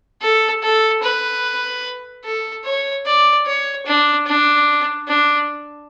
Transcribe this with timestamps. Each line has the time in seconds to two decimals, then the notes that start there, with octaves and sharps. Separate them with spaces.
0.21 A4
0.63 A4
1.03 B4
2.25 A4
2.65 C#5
3.06 D5
3.46 C#5
3.86 D4
4.27 D4
5.08 D4